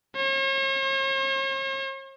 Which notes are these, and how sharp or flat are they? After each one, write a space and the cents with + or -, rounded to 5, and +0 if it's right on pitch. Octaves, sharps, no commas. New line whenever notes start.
C#5 -45